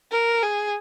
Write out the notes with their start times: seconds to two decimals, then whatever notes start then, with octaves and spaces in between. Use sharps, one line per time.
0.12 A#4
0.43 G#4